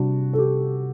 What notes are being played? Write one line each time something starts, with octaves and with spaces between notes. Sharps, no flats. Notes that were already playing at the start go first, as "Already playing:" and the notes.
Already playing: C3 G3 D4 F#4
A4
G4